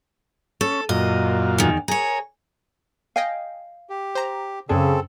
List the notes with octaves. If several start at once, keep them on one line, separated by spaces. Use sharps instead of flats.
C#4 A4
F#2 A#2 F4 D#5
E2 D#3
G#4 A#4 C#5
D#5 F5 G5 G#5
G4
C5 A#5
F#2 C#3 C4 D4 G#4 A4